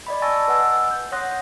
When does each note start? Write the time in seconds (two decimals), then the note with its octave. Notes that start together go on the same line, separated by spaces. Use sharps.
0.07 D5 D#5 B5
0.22 G#5 A5 C#6 E6 A6 A#6
0.48 B4 D#5 F#5 G#5 E6
0.91 G6
1.12 C#5 F#5 C6 D#6 F#6 A#6